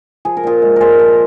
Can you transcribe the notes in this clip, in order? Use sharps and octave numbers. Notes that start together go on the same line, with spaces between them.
F3 G#4
A#4
A#2 F4 G#4
G#3
A#2 G#4 A#4 C5
F3